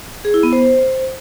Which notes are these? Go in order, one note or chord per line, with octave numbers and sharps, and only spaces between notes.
G#4
E4
B3
C5